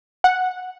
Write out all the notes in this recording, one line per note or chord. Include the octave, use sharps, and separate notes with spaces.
F#5